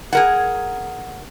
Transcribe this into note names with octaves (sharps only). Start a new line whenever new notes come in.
G#4 A#4 F#5